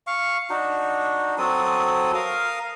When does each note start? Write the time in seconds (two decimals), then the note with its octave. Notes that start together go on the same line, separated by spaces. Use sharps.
0.07 F5 C#6
0.50 D4 D#4 F#4
1.38 F#3 C4 A4 D#6
2.14 A#4 F5 D#6